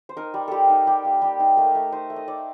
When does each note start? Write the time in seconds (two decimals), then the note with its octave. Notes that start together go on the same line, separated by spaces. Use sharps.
0.09 C5
0.17 D#4 A#4
0.34 G3
0.48 G3 G4 A4
0.69 D#4
0.87 G3 G4
1.05 A#3
1.22 G3 G4
1.40 D#4
1.57 A3 A#4
1.75 A3
1.92 D#4 C5
2.10 A3
2.16 D#5
2.28 D#4 D5